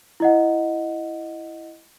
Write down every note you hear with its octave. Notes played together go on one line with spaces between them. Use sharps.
E4 D#5 F#5